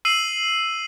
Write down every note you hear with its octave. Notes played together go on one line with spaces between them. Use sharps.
E6 C7 D#7 F#7